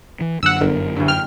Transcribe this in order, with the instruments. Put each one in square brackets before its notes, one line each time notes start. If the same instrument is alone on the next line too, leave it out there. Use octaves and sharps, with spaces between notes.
[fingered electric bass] E3
[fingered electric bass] F#2 D3 [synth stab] F#5 E6
[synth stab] G1 [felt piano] A#4
[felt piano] D2 G2
[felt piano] G5 [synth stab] F6